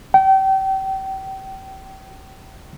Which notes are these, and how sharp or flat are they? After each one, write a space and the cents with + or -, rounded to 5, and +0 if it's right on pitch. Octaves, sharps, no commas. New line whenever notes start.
G5 -30